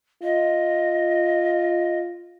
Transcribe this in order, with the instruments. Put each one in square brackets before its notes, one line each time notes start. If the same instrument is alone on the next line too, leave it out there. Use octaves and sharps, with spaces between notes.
[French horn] F4 [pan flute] D#5